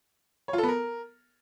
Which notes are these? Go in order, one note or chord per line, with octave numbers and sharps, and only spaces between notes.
C#5
F4
A4
B3
A#4